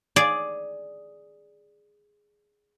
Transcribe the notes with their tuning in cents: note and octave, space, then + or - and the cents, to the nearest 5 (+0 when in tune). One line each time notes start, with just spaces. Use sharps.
G#4 +0 D5 +0